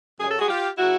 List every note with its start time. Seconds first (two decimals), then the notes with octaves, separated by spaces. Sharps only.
0.20 F#2 C#3 F#3 G#4
0.30 A4
0.39 F#4 G#4
0.48 F4 G4
0.78 C#3 F#3 E4 F#4